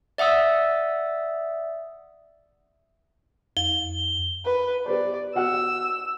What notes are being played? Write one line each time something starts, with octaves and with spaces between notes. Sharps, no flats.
D5 E5 F#5 D#6 E6
F2 G7
B4
G4 B4 C5 D5
F#4 F#5 E6 F6